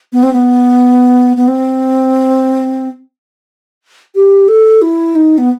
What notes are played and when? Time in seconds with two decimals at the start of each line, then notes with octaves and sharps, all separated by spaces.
0.13 B3
0.23 C4
0.33 B3
1.37 B3
1.48 C4
4.15 G4
4.48 A4
4.82 E4
5.15 D#4
5.38 B3